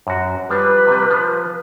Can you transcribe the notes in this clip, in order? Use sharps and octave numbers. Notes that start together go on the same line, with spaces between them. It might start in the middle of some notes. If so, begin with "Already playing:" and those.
F#2 F#4
F3 G3 D4 B4
C3 G3
F3